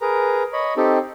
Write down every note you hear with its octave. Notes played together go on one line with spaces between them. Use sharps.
G#4 A#4 B4 A#5
C#5 D#5 B5
C4 D#4 G4 A4